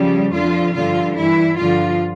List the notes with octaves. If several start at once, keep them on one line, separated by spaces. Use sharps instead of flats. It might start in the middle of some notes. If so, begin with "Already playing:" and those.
Already playing: C#3 F3 G3
F2 D3 F3 F4
G2 D3 F3 F4
G2 E3 E4
G2 D3 F3 F4